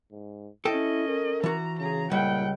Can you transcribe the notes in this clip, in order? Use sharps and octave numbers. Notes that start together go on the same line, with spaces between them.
G#2
C#4 E4 A4 D#5 G5
A#4
E3 F#4 A#5
C#3 G#4 A#5
C#2 A#2 G3 F#5 G5